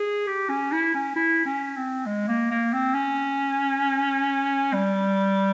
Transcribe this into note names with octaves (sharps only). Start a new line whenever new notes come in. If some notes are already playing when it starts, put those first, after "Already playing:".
Already playing: G#4
G4
C#4
E4
C#4
E4
C#4
C4
G#3
A#3
A#3
C4
C#4
G3